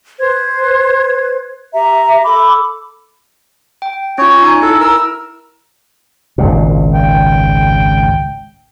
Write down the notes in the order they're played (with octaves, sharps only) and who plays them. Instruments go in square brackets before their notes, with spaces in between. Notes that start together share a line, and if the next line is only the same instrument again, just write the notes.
[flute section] B4 C5 G#6
G4 E5 A#5
A4 B5 D6
[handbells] G5
[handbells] C#4 F4 [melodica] C#5
[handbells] D#4 G#5
[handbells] E4 [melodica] A4
[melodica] A#4 E6
[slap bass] G#1 C#2 A#2
[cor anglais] G5